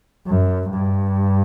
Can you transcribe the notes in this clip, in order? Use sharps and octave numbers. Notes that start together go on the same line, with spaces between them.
F#2
G2